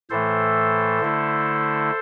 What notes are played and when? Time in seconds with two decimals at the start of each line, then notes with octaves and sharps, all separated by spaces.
0.10 A2 E3 A3 A4 C5
1.00 D3 A3 E4